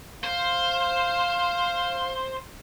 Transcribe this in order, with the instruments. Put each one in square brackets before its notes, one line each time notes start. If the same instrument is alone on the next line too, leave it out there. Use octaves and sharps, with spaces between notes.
[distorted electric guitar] C5 [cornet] F5